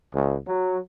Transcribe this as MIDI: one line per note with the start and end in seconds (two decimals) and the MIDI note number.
0.14 0.35 37
0.46 0.78 54